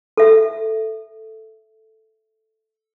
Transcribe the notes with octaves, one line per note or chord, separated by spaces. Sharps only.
A4 E5